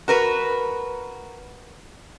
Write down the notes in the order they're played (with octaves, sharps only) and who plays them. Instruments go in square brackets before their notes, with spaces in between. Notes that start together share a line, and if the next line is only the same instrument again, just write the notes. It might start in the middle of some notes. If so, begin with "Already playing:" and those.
[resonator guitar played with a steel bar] F#4 A#4 B4